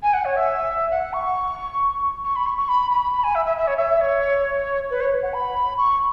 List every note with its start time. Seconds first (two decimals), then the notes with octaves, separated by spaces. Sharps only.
0.03 G#5
0.13 F#5
0.25 C#5
0.36 E5
0.91 F#5
1.13 C#6
2.24 C#6
2.36 B5
2.46 C#6
2.58 C#6
2.69 B5
2.91 B5
3.13 B5
3.24 G#5
3.35 E5
3.45 E5
3.58 E5
3.67 C#5
3.77 E5
4.01 C#5
4.90 B4
5.01 C#5
5.23 F#5
5.34 B5
5.78 C#6